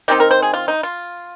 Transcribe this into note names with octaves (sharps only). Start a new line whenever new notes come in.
D#3 G3 C4 D#4 G4
A#4
C5
G#4
F4
D#4
F4